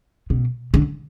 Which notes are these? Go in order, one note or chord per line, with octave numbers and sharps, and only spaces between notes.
B2
D3